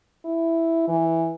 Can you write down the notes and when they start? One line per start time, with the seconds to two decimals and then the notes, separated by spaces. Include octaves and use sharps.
0.25 E4
0.88 E3